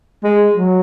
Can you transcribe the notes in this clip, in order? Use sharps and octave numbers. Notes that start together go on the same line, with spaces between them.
G#3
F#3